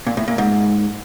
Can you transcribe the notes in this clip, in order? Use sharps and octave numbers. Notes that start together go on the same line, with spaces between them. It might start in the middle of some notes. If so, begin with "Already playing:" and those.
A#2
A2
A#2
G#2